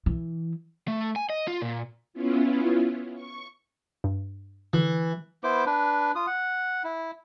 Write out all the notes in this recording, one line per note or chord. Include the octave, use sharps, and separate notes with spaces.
E3
A3
G#5
D#5
F4
A#2
B3 C#4 E4 F4
C#6
G2
D3 E3
B3 E4 C5 D6
D4 B4
F4 D#6
F#5
E4